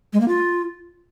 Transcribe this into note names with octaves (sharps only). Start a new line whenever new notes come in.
G#3
A#3
F4